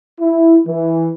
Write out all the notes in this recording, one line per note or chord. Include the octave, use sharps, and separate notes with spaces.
E4
E3